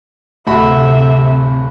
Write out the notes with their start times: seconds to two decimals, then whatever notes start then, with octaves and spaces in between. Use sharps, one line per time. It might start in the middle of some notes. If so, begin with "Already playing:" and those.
0.47 D1 C3 A3 F#4 E5 B5